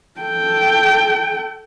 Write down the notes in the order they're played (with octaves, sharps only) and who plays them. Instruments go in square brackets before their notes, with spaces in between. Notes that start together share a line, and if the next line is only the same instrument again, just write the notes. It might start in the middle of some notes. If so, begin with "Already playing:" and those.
[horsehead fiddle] A4 G5